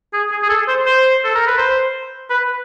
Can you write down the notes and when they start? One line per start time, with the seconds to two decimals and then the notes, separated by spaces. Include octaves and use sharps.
0.13 G#4
0.31 G#4
0.43 G#4
0.49 A4
0.68 C5
0.86 C5
1.24 A4
1.35 A#4
1.47 B4
1.57 C5
2.30 B4